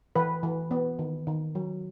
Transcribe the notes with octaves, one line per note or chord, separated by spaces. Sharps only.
E3 B4
E3
B3
D#3
D#3
F#3